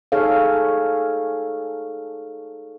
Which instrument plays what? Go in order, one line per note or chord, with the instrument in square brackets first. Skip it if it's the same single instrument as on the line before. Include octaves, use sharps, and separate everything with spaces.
[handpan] D#4 G#4 A4 C#5 F5